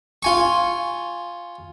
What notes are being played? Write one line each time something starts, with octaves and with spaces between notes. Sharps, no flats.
F4 G#5 C#6